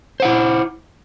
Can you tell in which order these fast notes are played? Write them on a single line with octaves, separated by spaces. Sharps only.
C5 F#5 E4